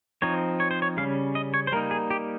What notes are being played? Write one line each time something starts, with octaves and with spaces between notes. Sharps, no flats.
F3 C4 D#4 C#5
C#5
C5
C#5
C#3 G3 C#4 F5
D#5
C#5
C5
G3 A#3 D#4 A#4
G#4
G4